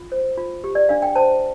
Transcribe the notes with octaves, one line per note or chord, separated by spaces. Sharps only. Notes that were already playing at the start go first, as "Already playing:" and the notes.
Already playing: F4
C5
F4
G4
D5
D4 F5
G5
C5 A5